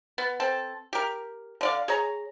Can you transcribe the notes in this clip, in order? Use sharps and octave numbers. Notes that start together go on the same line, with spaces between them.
B3
C4 A4
G4 A#4
D3 D5 F5
G#4 C#5 A#5